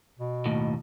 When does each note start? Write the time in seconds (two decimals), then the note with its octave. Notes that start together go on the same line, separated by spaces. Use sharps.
0.19 B2
0.46 D#2 A2